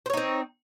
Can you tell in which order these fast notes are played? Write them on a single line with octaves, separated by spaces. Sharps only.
C5 C#5 D#4 C4